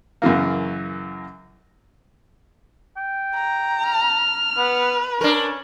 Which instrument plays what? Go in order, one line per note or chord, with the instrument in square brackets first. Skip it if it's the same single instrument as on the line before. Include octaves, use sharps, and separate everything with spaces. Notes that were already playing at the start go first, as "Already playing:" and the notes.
[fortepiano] F#2 C#3 E3 A#3
[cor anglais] G5
[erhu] A#5
[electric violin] F6
[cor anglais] B3 [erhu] B4
[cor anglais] C#4 [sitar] D4 A#4